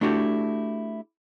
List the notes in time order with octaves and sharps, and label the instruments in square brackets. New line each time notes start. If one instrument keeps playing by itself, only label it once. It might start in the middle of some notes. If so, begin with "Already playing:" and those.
[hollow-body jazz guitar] A3 D4 E4 F#4 G4